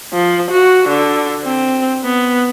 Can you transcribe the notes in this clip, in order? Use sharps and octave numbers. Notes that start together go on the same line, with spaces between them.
F3
F#4
D3
C4
B3